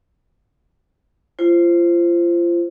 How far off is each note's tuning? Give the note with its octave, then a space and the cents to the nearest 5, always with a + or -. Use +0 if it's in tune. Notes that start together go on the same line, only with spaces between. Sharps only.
F4 -30 C5 +0